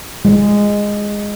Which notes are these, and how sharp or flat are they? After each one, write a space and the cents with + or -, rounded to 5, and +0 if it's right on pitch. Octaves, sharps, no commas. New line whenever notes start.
G#3 -10 F4 -15